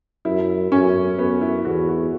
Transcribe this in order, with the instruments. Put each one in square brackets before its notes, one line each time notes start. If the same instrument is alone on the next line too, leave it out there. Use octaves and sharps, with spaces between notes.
[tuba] F#2 [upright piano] E4
[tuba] F#2 [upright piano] C#4
[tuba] F#2 [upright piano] B3
[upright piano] E4
[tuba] E2 [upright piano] F#4
[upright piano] F#4